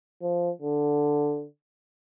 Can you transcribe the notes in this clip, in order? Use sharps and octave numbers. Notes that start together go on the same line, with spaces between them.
F3
D3